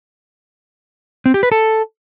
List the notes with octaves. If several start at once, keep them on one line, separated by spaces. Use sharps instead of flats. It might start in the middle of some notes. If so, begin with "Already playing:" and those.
C4
G4
B4
A4